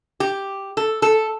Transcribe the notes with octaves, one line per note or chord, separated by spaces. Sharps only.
G4
A4
A4